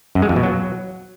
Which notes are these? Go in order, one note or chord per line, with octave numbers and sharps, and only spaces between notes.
F#2
G#3
F2
B2
F#3